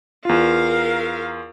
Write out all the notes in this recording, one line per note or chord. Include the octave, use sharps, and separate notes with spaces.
E2 F4 A#4 F5